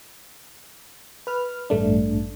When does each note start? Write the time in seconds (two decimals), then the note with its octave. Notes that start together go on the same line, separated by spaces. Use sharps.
1.27 B4 F6
1.70 A1 G2 A3 D4